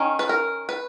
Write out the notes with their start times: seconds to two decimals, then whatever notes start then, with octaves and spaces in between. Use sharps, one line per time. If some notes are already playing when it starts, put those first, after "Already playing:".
Already playing: D#3 C#4
0.19 B4
0.29 A#4
0.69 B4